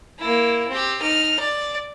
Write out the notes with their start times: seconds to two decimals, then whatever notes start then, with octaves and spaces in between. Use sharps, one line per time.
0.19 A#3 E4
0.69 C4 G4
1.02 D#4 F6
1.39 D5